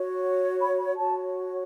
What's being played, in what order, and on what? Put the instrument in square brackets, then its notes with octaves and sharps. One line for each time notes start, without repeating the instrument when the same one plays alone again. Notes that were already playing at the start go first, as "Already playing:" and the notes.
Already playing: [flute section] F#4 C#5
B5
B5
F#4 C#5 A5